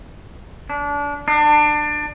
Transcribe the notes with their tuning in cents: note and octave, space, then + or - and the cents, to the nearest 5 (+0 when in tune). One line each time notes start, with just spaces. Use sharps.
D4 -25
D4 +25